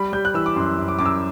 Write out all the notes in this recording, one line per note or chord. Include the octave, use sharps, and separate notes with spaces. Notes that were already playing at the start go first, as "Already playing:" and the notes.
Already playing: G3 B5
G3 G6
F#6
E3 E6
D6
F#2 C6
F#2
D6
F#2 D6
E6